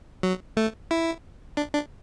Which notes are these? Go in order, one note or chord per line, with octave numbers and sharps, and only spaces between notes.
F#3
A3
E4
D4
D4